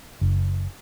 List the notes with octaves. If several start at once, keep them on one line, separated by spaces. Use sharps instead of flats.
F#1